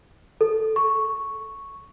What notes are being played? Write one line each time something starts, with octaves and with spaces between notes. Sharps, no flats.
A4
C#6